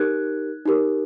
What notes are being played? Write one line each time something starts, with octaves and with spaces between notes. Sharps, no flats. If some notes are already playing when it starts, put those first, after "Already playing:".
Already playing: D#4 G4 A#4 F#6 G#6
D#4 G4 A#4